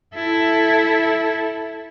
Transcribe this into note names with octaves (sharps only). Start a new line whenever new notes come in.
E4 A4